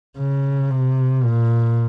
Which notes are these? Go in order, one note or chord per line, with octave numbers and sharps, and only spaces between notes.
C#3
C3
A#2